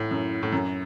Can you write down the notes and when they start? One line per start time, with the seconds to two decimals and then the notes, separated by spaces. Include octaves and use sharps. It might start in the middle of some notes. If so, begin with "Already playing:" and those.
Already playing: A2
0.11 F#2
0.43 A2
0.52 F#2